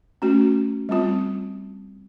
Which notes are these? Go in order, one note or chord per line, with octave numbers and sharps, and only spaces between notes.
A3 C#4 F#4
G3 C4 F4